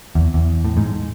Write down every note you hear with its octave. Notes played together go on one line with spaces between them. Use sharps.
E2
E2
A2
G#2